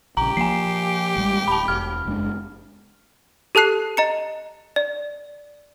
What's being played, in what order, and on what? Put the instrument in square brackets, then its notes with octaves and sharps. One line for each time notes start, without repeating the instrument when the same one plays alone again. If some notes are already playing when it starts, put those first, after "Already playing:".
[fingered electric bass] A#1 C#3 [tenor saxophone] G4 [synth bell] A#5
[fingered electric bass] F3 A#3 [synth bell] G#5 C7
[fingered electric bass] A1 G3 G#3
[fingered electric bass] D1 [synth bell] A5 B5
[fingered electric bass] E1 [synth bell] F6
[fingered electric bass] F#1 G#3 D4
[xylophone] G4 A4 A5 F#6 C7
D#5 A#5 C#7
D5